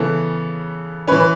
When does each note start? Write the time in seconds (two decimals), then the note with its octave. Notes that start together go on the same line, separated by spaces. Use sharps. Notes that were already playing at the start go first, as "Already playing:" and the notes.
Already playing: C#3 E3 B3 A4
1.07 C#4 B4
1.12 E3
1.20 B4